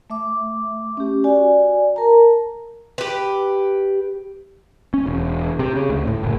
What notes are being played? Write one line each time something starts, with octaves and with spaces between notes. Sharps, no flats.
A3 E5 D6
C#4 G4
F#4 D5 G#5
A#4 A5 A#5
G4 B4
C#4
E1
C3
C#3
D2
A2
F#1